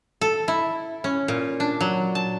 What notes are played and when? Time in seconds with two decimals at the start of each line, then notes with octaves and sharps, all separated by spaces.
0.21 A4
0.48 E4
1.04 C#4
1.28 A#2
1.60 D4
1.81 F#3
2.15 A5